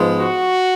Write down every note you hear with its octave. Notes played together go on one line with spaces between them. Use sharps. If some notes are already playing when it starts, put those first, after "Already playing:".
Already playing: G#2 F3 G#3 B3
F#4